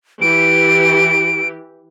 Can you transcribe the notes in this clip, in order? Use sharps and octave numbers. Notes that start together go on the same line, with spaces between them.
E3 G4 D7